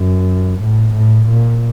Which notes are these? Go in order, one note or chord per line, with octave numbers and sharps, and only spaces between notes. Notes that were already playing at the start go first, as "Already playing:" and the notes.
Already playing: F#2
A2
A2
A#2